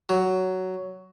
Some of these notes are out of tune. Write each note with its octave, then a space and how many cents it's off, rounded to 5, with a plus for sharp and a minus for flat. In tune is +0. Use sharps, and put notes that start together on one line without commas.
F#3 +10